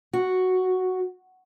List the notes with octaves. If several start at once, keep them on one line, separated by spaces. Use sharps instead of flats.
F#4